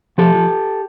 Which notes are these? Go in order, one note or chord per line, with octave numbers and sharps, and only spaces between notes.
F3 G4 A4
F3